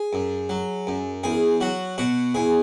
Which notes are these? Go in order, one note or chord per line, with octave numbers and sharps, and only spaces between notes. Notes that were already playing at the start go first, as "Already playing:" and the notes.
Already playing: G#4
F#2
F#3
F#2
E2 G#4
F#3 F#4
B2 F#4
E2 G#4